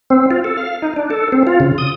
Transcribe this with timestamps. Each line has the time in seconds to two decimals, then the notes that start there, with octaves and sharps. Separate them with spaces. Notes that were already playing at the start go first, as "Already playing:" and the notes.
0.10 C4
0.31 F4
0.44 A4
0.57 F5
0.82 D#4
0.96 D4
1.10 A4
1.32 C4
1.47 F4
1.60 C#3
1.78 D#6